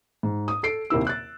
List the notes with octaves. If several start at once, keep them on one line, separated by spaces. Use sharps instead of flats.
G#2
D#6
A4 C7 D7
D#2 C3 A#3 E4 E6
F#6 A6